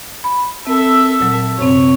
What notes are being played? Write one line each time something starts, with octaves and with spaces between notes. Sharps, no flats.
B5
C4 A4 E5
A#2 F#3
F#2 C3 C4 C#5